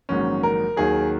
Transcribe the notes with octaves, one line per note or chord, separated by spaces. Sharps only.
A#1 G#2 D#3 F#3 C#4
A#4
D#2 D#3 F#3 G#4